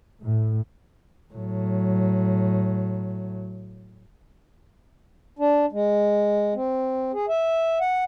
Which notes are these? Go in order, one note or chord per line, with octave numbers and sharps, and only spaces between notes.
A2
A2 F#3
D4
G#3
C4
G#4
E5
F#5